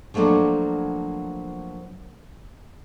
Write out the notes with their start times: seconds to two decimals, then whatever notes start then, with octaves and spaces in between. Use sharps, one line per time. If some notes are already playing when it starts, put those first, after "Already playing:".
0.14 F3 F#3 A3 A#3 D4